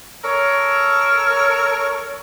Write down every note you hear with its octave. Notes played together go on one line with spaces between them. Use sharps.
A4 A#4 C#5